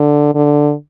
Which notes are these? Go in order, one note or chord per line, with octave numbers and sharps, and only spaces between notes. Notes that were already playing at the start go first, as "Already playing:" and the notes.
Already playing: D3
D3